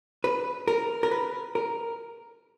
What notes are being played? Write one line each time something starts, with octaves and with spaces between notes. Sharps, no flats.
B4
A#4
A#4
B4
A#4